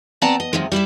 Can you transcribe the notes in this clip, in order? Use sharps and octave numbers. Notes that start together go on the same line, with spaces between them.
B3 C4 D5 F#5 A5 A#5
D#5
C3 D#3 F3 F#3 G#3
G3 E4 D5 E5